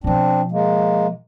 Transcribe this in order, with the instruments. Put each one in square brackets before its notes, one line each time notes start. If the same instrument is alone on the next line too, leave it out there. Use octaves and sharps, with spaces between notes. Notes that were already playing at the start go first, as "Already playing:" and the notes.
[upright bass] B2 F3 [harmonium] C4 D4
[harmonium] G#3 A#3